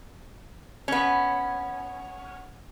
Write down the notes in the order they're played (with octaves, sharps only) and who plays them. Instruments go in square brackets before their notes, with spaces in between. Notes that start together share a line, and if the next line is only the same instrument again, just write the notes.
[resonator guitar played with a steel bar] B3 C#4